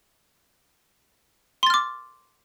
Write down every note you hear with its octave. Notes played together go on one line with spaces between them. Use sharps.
C6 D6 F6 A6